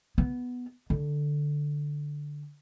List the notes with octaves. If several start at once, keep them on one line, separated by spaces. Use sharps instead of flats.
B3
D3